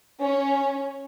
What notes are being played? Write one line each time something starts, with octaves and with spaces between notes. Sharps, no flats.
C#4